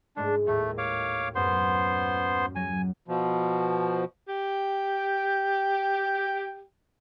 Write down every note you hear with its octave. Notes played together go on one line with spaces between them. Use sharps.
G#2 G#3 A3 D4
D#2 A2 A3
C#5 F5 D6
F#2 B3 C5 C6
F#3 G#5
B2 F3
G4 G5